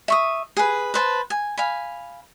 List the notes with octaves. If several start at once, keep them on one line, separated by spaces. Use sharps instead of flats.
E5 C#6 D#6
G#4 B4
B4 C5 A5
G#5
F5 G#5 B5